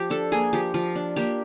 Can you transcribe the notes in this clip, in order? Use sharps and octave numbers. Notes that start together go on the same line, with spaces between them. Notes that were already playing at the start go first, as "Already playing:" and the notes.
Already playing: F3 G4
D4 A4
A#3 G#4
F3 G4
F3 F4
D4
A#3 G4